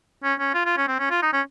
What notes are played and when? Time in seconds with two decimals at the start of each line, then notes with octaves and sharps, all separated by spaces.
0.23 C#4
0.39 C#4
0.54 F4
0.65 F4
0.77 C#4
0.88 C4
0.99 C#4
1.11 F4
1.22 D#4
1.33 C#4